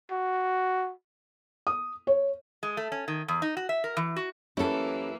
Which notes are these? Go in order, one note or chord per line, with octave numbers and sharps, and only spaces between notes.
F#4
D#6
C#5
G#3
A3
C#4
D#3
E2
D#4
F#4
E5
A#4
E3
F#4
F#2 E3 A#3 C#4 E4 G4 A4